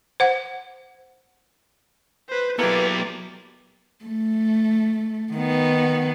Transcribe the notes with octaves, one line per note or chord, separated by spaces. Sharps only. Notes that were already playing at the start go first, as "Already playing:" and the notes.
C5 F#5
B4 C5
F#3 A#3 B3 E4 G4 A4 B4 D5
A3
D#3 B3